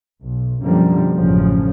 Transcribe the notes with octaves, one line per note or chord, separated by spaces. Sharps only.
B1
F#2 B2 D3 F3 G3 A#3
A1 F#2 C#3 F3